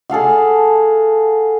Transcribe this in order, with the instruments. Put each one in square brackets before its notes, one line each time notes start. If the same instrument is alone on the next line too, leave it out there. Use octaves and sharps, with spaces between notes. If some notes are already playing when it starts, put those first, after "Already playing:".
[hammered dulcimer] G#4 A4 F5 F#5